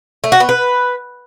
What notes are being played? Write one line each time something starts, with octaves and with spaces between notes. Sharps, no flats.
A3
F#4
B3
B4